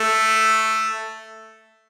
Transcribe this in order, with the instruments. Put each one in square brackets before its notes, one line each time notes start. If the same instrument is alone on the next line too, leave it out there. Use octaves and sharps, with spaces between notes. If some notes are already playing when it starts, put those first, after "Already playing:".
Already playing: [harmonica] A3